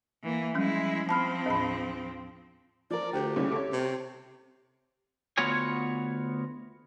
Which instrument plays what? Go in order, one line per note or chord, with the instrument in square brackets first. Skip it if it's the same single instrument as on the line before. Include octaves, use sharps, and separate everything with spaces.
[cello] E3 A#3
[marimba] F3 G3 C#4 [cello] G#3 E4
[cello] F3 C4 [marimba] A5 B5 F6
[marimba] D#2 A2 B5
[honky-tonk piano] F3 A#4 [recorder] D5
[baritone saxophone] D2 [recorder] G4 [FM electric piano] G5
[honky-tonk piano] C2 C#3 E4 [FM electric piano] C#4
[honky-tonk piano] A4 C#5 [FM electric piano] D6
[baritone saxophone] C3
[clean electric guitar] D2 B3 F4 F#4 C#5 G#5